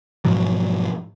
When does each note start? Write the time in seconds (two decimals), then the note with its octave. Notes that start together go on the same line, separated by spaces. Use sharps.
0.25 G#2 B2 F3 F#3